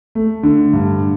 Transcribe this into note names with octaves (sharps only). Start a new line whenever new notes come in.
A3
D3
G2